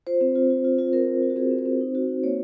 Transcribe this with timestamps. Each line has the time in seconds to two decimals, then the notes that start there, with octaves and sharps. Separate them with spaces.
0.07 F4 C5
0.21 C4
0.35 F4
0.50 F4
0.65 F4
0.78 F4
0.93 C4 A#4
1.08 C4
1.22 F4
1.30 F#4
1.36 C4 G#4
1.51 C4
1.58 C5
1.66 C4
1.81 D#4
1.95 F#4
2.09 D#4
2.23 A#3 C#5